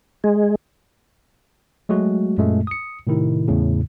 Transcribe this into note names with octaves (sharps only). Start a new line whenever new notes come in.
G#3
F#3 G#3 A3 F#4
F#2 A#2 G#3 A3
D#6 C#7
A2 C3 D#3 E4
E2 A2 C#3